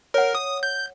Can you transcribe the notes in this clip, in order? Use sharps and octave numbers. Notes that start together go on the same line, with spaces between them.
A#4 C#5 F#5
D#6
G6